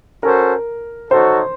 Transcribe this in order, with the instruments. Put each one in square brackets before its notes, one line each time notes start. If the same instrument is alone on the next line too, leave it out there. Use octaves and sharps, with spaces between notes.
[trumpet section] C#4 F#4 A4 C5 [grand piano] A#4
[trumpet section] D#4 F#4 A4 C#5 [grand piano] C5